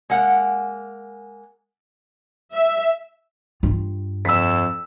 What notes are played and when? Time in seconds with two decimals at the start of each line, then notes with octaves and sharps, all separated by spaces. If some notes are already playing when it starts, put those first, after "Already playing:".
0.10 G#3 A#3 F#5
2.54 E5
3.63 G2 F4
4.25 F2 E6 B6